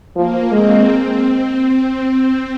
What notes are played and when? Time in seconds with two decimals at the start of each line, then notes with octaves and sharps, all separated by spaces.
0.16 F3 A#3
0.52 G#3 C4
1.23 C4